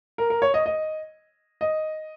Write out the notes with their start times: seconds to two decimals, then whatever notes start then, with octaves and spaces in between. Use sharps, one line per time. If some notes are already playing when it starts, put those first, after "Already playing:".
0.18 A#4
0.30 A#4
0.42 C#5
0.54 D#5
0.66 D#5
1.61 D#5